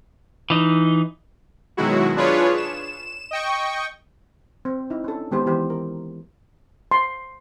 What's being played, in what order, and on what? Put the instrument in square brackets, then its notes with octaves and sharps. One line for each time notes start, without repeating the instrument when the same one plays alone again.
[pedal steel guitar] E3 D#4
[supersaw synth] B2 D#3 F#3 G#3 E4 F#4
D4 F4 G#4 B4 C#5
E7
D#5 G5 C#6
[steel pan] C4
D#4 E4
C#4 D4 A4
D#3 G#3 B3 G4 C5
E3 B3 E4 G4 C5
A#4
C6